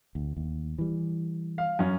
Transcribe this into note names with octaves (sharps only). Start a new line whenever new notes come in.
D2
D#2
E3 G3
F5
F#2 C#4